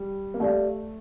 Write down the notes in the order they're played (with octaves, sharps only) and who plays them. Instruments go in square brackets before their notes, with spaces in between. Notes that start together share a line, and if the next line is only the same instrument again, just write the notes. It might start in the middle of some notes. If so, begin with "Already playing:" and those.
Already playing: [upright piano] G3
A#3
[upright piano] A3 [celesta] G4 D5 F5